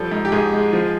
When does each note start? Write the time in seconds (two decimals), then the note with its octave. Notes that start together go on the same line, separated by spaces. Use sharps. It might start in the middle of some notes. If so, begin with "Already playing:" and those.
Already playing: F3 G3 A4
0.12 G#2
0.25 G4
0.32 G#2 G#4
0.53 G#3
0.73 F3